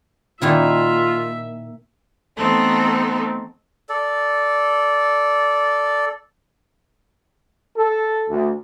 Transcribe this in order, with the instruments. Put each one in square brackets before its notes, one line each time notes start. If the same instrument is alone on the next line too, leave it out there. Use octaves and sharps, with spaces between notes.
[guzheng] A#2 D#3 E4 [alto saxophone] F4 [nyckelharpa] E5
[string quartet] E3 A3 B3 C4 D#4 A4
[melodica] A4 D5
[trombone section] A4
D2